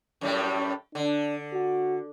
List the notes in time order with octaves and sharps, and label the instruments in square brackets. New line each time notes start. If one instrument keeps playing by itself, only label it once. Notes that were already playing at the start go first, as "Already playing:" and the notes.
[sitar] F#2 A2 G3
[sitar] D3 [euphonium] D4
[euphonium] F#4